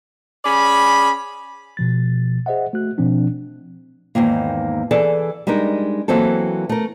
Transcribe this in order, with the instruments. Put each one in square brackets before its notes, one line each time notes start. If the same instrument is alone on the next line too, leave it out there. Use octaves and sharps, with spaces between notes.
[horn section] C#4 G#4 D5 B5
[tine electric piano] B2 F3 A6
G#4 C5 D#5 E5 F#5
A3 F#4 F#6
B2 F3 C4 D4
[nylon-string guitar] E2 G#2 D#3 A#3
E3 G#4 A4 D5
G3 G#3 D4 D#4 A#4
E3 F#3 A#3 C4 A4
A3 A#4